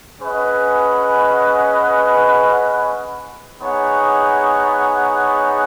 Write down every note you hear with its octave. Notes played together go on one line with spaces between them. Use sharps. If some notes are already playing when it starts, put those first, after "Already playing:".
C#4 G#4 B4 D#5 F#5
B3 D#4 G#4 C#5 F#5